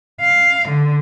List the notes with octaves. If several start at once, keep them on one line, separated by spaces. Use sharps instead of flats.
F5
D3